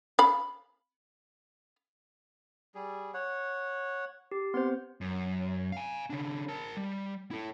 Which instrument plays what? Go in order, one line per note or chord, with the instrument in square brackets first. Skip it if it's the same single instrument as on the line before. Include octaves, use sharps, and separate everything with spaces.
[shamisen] F5 B5
[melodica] G3 G#4
C#5 F#5
[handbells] G4
[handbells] B3 C4 C5 [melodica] C6
[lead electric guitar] F#2
F5 G#5
C#3 D4
A#4 A5
G3
E4 A4